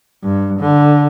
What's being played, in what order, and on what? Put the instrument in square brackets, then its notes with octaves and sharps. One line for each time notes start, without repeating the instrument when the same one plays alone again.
[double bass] G2
D3